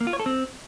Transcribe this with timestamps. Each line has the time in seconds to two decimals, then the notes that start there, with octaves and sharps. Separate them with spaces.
0.01 A#3
0.07 F4
0.13 C#5
0.20 A4
0.26 C4